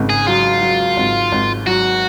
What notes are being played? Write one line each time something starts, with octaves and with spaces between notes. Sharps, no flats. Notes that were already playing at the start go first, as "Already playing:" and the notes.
Already playing: G#1 C#3
G#4
F#3 F4
F#3
G#1
G#1
F#3 F#4